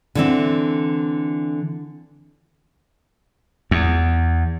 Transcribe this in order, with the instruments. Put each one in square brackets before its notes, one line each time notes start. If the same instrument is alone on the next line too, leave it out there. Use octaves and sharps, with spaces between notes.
[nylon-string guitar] D3 E3 C4
[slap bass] E2